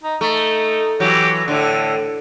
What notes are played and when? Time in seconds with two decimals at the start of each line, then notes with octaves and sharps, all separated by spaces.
0.03 D#4
0.21 A3 D#4
1.00 E3 F#3 G4
1.48 A2 D3